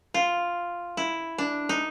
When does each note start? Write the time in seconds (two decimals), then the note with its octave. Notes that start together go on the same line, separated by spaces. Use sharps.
0.14 F4
0.97 E4
1.38 D4
1.69 D#4